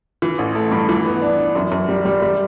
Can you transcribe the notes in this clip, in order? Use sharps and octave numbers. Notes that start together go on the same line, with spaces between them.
E3
A1
A3
G2
E3
B3
D4
D4
F#2
F#2
G3
G3
G3